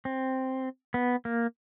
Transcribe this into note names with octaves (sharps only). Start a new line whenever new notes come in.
C4
B3
A#3